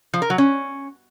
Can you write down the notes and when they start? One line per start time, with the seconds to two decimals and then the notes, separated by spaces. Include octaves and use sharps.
0.14 F3
0.22 A#4
0.30 F#3
0.38 C#4